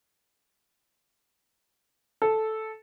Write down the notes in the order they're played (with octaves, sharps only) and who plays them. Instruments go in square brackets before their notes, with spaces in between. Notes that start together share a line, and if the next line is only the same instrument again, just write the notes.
[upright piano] A4